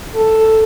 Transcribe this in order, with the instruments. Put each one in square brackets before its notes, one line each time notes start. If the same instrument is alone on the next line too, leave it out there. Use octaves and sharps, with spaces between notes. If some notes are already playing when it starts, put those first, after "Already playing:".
[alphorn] A4